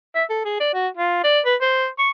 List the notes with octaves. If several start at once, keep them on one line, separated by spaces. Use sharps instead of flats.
E5
A4
G#4
D5
F#4
F4
D5
B4
C5
C#6